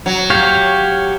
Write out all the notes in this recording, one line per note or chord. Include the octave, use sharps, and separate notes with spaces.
F#3
G4 C#5 F5